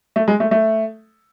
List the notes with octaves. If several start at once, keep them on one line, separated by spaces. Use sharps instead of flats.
A3
G#3
A3
A3